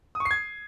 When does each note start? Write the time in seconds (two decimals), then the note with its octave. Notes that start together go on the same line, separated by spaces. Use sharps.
0.15 D#6
0.20 C#6
0.25 C7
0.31 G#6